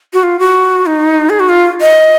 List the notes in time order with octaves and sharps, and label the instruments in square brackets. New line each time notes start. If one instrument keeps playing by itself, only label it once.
[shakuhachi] F#4
F4
F#4
D#4
G#4
F#4
F4
D#5